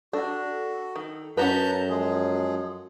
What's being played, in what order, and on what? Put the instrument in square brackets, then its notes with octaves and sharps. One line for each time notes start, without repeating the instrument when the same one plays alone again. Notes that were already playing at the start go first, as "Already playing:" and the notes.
[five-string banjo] D4 [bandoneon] F#4 [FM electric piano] A4
[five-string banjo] D#3
[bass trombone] F#2 [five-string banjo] C#4 F#4 B4 [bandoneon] A5 A#5 G6
[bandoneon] F3 G#3 G#4